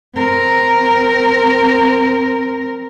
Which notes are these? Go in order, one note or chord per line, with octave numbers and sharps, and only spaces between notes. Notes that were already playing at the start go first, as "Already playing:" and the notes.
C4 A#4